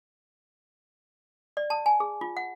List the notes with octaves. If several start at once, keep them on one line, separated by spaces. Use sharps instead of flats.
D5
A5
G#5
G#4
F4
F#5